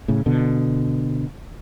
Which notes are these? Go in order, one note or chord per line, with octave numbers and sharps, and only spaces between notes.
A2 C#3
B2 D3